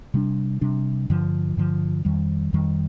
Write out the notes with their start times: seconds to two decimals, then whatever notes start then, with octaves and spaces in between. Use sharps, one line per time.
0.14 C3 G3 D4
0.61 C3 G3 D4
1.10 G2 D3 F3
1.57 G2 D3 F3
2.05 F2 D#3 G3
2.53 F2 D#3 G3